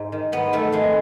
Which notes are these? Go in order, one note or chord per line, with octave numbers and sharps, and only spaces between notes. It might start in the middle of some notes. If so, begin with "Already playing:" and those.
Already playing: G#2 D#4
D#3
G#2 B3
D#3 A3
F2 G#3